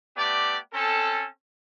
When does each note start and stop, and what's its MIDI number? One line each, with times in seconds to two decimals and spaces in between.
0.17 0.58 57
0.17 0.58 59
0.17 0.58 67
0.17 0.58 74
0.73 1.27 60
0.73 1.27 61
0.73 1.27 69